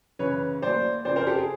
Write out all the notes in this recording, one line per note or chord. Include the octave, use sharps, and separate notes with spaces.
F#2 C#3 E3 B4 C#5
A2 F#3 A#3 C5 D5
F2 C#3 F3 C5 D5
A#4 C5
G4 A4
G#4